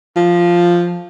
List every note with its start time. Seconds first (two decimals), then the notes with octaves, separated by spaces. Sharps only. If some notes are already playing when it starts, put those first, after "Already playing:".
0.16 F3